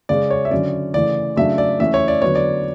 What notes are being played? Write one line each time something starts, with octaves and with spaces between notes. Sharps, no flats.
C#3 G#3 C#4 D5
C#5
E5
D3 F#3 C#4 D5
C#3 E3 A3 D5
C#3 F#3 A3 D4 E5
D5
E3 A3 C#4 E5
C#5
D5
D3 F#3 B3 C#5
D5